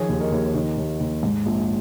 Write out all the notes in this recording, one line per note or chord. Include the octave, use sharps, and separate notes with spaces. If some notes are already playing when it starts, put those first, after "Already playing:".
Already playing: D#3 F3 G#4 C#5
D#2
A#4 D#5
D#2
D#3
D#2
D#2
G#2
A#1